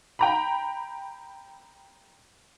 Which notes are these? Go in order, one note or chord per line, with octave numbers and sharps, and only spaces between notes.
G5 A#5 B5